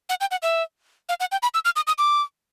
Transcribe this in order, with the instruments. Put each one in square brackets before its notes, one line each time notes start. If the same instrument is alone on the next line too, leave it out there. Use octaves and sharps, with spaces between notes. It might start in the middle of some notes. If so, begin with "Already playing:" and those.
[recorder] F#5
G5
F#5
E5
F5
F#5
G5
B5
E6
F6
D#6
D#6
D6